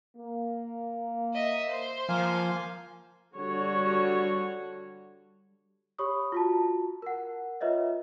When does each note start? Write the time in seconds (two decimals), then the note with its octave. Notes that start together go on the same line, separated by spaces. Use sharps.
0.17 A#3
1.33 D#5 E5
1.69 C5
2.09 F3 A#3 F5 G#5
3.35 D3 G3 F#4 C#5
5.99 G4 C#5 B5 C#6 D#6
6.32 F4 F#4 A5
7.02 A#4 F#5
7.61 F4 B4 C#5 D#5 E5